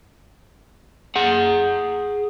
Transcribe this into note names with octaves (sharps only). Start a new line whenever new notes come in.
G#4 F#5